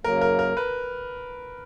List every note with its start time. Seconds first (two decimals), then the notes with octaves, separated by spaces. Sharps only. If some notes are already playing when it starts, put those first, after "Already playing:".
0.04 F#2 C#3 F#3 A#3 A#4
0.21 A#4
0.39 A#4
0.57 B4